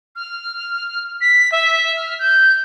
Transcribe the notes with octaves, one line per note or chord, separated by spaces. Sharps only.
F6
B6
E5
F6
G6